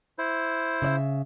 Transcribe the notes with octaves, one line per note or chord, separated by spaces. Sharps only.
E4 C5
C#3 D5 E5